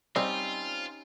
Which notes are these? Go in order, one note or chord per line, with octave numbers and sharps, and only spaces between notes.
G3 C4 C#4 D#4 F4 G4